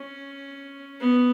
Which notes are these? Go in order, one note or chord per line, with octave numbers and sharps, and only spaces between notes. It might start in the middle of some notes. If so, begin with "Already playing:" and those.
Already playing: C#4
B3